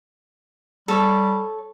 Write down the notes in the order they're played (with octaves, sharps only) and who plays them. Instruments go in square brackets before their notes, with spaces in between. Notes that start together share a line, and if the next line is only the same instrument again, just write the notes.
[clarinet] G3 [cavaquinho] A4 C#5